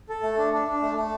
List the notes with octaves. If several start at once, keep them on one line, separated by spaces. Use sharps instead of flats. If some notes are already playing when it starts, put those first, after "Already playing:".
A4
A3
D4
D4
D4
A3
A3